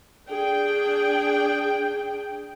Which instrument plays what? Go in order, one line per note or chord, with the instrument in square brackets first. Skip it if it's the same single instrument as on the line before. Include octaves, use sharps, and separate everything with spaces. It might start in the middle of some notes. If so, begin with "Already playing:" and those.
[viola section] D4 G#4 G5